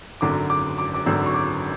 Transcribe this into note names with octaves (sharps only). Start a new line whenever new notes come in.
G#1 F#2 D3 F#3 D6
D6
D6
D6
G#1 F#2 D3 F#3 E6
C#6
D6